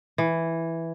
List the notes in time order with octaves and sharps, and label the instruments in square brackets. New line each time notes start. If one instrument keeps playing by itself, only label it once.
[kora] E3